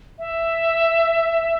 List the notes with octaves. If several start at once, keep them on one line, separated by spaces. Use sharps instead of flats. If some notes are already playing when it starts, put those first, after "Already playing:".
E5